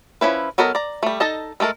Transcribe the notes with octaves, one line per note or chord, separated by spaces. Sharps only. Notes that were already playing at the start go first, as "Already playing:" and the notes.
F3 C#4 E4 B4
F#3 B3 A4 A#4 D#5
D5 A#5
G3 A3
D#4 A4 D#5 A5
G#3 A3 A4 A#4